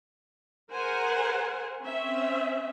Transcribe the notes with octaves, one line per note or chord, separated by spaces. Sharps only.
G#4 A#4 C5 F#5 G#5
C4 C#4 E5